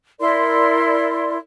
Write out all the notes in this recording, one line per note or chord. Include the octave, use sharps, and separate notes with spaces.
E4 A#4 D5 C6